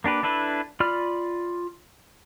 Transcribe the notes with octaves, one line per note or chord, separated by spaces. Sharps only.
A#3 D4 G4 B4
D4 E4 A4 B4
F4 D5 B5 F6